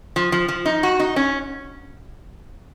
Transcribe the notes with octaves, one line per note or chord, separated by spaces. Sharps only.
F3
F3
F3
D#4
F#4
D#4
C#4